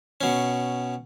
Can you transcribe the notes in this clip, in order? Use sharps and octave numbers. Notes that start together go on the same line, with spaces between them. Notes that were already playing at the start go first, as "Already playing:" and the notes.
B2 C#4